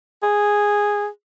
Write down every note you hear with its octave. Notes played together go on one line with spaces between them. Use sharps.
G#4